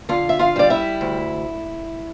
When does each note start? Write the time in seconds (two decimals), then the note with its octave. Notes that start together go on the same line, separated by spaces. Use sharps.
0.09 D3 F4 F5
0.29 E5
0.39 F4 F5
0.56 G3 D5
0.70 E4 E5
1.01 D2